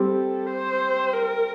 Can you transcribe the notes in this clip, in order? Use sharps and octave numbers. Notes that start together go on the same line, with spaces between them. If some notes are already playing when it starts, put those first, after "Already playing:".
Already playing: G3 C4 G4 A4
C5
A#4